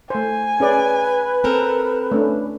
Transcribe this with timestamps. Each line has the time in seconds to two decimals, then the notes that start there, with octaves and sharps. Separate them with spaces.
0.10 A3 C5 G#5
0.60 C#4 G#4 B4 D5
1.44 C4 A4 A#4
2.12 A3 C#4 D4